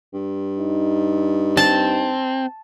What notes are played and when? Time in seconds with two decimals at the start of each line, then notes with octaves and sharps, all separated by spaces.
0.13 G2
0.60 D#4
1.57 C4 A5